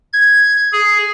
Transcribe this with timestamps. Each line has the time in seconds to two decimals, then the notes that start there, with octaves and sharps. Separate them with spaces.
0.13 G#6
0.72 G#4